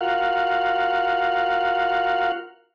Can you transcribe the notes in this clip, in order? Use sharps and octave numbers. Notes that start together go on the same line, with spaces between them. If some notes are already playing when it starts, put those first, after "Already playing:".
F4 F#4 A#4 F5 F#5